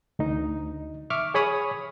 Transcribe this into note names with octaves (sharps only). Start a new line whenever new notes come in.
D2 D#4
E5 C#6 D6 F6
G#4 C#5 B5 D#6